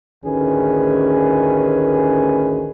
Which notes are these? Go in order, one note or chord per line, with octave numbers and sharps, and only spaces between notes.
A1 D2 D#3 C#4 G#4 B4